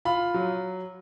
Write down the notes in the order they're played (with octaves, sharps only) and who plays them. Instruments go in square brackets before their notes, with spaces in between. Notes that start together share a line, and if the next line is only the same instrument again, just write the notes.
[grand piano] F4 B5
F#3